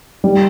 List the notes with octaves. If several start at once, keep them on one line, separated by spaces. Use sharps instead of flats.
G3